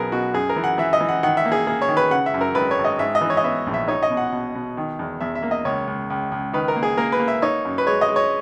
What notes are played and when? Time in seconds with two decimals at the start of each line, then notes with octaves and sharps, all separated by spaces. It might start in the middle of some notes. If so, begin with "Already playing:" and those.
Already playing: B1 B3 G#4 A#4
0.12 B2 F#4
0.34 F#2 G#4
0.49 A#4
0.56 E3
0.64 F#5
0.78 E3 E5
0.93 D#5
1.01 E3
1.09 F#5
1.23 D#3 F#5
1.37 E5
1.45 A#3
1.52 G#4
1.67 A#3 G#4
1.82 C#5
1.89 D#3
1.97 B4
2.11 C#3 F#5
2.26 E5
2.34 F#2
2.41 A#4
2.55 G#1 B4
2.71 C#5
2.78 G#1
2.84 D#5
2.99 G#2 E5
3.15 D#5
3.21 E3
3.30 C#5
3.37 D#5
3.44 B3 E5
3.67 A#1
3.74 E5
3.88 D#4 C#5
4.03 D#5
4.10 B2
4.17 F#5
4.32 B2
4.55 B2
4.77 D#3
4.99 E2
5.21 E2 E5
5.35 E5
5.43 A#3
5.51 D#5
5.65 C#2 C#5
5.87 C#2
6.10 C#2
6.32 C#2
6.53 D#3 B4
6.68 A#4
6.76 A#3
6.83 G#4
6.97 A#3 A#4
7.12 B4
7.20 A#3
7.28 E5
7.42 D#4 C#5
7.65 F#2
7.78 B4
7.86 G#3 C#5
8.01 D#5
8.08 G#3
8.16 C#5